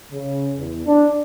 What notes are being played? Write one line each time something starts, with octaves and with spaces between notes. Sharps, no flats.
C#3
E2
D4